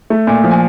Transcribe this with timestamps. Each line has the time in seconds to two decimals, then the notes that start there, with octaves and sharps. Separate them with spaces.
0.10 A3
0.27 A#2
0.44 F3
0.51 G#5